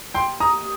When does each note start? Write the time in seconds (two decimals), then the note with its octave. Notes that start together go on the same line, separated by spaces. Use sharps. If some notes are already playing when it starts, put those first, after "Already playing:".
0.14 A#3 G4 A#4 D#5 G5 C6
0.40 A#5 D#6